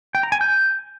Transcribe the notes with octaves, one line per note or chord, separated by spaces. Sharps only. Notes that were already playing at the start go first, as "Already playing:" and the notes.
G5
A#5
G#5
G6